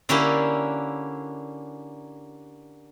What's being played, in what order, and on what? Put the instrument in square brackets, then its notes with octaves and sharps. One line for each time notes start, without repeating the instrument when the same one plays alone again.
[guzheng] D3 A#3 C#4 D4 E4 G4